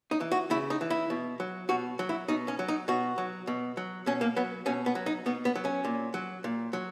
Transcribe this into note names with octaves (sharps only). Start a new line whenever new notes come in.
D#4
E3
F#4
C#3 E4
D#4
E3
E4
B2
F#3
B2 F#4
F#3
E4
B2 D#4
C#4
F#3
D#4
B2 F#4
F#3
B2
F#3
B2 C#4
A#3
F#3 B3
B2 C#4
B3
F#3
D#4
B2 B3
B3
F#3
C#4
A#2
F#3
A#2
F#3